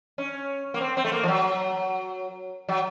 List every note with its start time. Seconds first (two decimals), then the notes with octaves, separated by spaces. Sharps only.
0.18 C#4
0.74 A#3
0.81 C4
0.97 C4
1.05 A3
1.12 A#3
1.23 F3
1.28 F#3
2.68 F#3